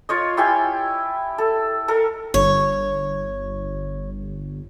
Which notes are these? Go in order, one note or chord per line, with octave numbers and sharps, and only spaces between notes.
F4 C#5 D#5
E4 G4 G5 G#5
A4
A4 A#4
G1 C#5